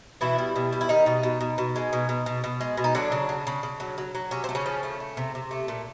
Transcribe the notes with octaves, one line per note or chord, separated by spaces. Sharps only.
B2 E3 E4
G3
B2
G3
E4
D#3 G3 D#4
B2
B2
B2
B2
G#3
B2
B2
B2
B2
G#3
B2
D#4
D3 F#3 D4
C#3
C#3
C#3
C#3
F#3
F#3
F#3
C3 C#4
C4
A3
C#3 C#4
F3
A3
A3
C3
C3
A3
A#2